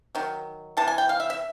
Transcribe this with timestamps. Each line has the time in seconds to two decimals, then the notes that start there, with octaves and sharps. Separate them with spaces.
0.15 D#3 F#3
0.77 C3 E3 A5
0.88 G#5
0.98 G5
1.09 F5
1.20 E5
1.30 E5